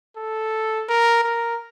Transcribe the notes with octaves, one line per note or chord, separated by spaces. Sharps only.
A4
A#4
A#4